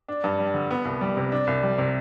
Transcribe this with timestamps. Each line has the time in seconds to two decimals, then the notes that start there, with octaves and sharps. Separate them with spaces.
0.08 D4
0.24 G2
0.39 G3
0.54 D3
0.71 B3
0.85 C2
1.01 G3
1.17 C3
1.32 D4
1.47 C2
1.63 G3
1.78 C3